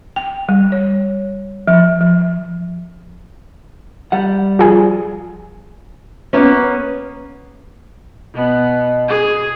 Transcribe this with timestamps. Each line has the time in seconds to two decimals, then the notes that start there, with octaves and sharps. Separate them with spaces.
0.16 G5
0.49 G3
0.72 C#5
1.67 F3
2.01 F3
4.12 G3 F#5
4.59 F3 G#4
6.33 A#3 B3 C#4
8.35 B2 B3
9.09 G#4